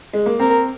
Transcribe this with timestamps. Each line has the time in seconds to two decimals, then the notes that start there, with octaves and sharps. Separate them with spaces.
0.13 G#3
0.26 A#3
0.39 C4 A#4